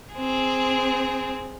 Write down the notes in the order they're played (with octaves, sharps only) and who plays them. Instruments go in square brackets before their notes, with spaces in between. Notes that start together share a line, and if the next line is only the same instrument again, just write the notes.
[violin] C4 G#4